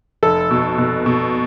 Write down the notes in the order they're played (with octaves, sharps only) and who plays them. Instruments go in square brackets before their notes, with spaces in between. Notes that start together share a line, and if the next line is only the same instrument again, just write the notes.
[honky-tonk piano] F1 [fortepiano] A4
[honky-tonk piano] B2
B2
B2